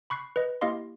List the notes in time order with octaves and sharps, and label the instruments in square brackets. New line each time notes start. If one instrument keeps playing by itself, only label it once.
[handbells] B5 C#6 F#6 C7
B4 D#5
A#3 E4 G4 D#5 F5 C6